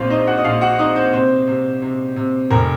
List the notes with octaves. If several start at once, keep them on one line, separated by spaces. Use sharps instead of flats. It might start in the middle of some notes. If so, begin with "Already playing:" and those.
Already playing: A#1 C4 F4 C5 F5
C4 D#4 D#5
F#4 F#5
D#5
A#1 F4 F5
F#4 F#5
C4 D#4 D#5
C4 C5
C3 C4 C5
C3
C3
C3
F1 A#4